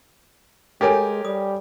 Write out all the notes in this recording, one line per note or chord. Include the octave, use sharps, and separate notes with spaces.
G#3 G4 A4 A#4 C#5 D#5 G#5
G3 D#6